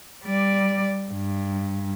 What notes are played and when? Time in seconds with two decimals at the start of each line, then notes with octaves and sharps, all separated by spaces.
0.25 G3 D5
1.12 G2